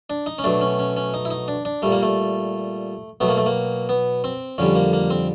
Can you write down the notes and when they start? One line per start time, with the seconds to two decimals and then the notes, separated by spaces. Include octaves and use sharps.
0.10 D4
0.26 D#4
0.38 C#4
0.44 B2 F#3 A3 D4
0.61 C#4
0.79 C#4
0.97 C#4
1.14 D#4
1.25 E4
1.31 D#4
1.48 D4
1.65 D4
1.82 A#2 G3 A3
1.92 A#3
2.02 A3
3.20 B2 F#3 A3 B3
3.29 A#3
3.37 A3
3.46 A#3
3.89 B3
4.24 C4
4.58 F2 D3 G3 C#4
4.75 A#3
4.93 A#3
5.10 C4